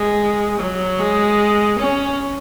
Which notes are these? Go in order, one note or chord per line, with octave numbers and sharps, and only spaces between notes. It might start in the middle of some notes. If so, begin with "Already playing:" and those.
Already playing: G#3
F#3
G#3
C#4